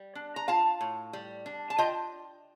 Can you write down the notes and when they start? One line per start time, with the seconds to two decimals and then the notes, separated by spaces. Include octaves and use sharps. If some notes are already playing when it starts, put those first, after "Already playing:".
Already playing: G3
0.15 D4
0.36 A#5
0.48 F4 F5 A5
0.81 A2
1.13 G3
1.46 D4
1.70 A5
1.78 F4 D#5 G5